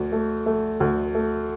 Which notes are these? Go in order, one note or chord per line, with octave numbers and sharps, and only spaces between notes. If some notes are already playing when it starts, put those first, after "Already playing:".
Already playing: D2
A3
A3
D2
A3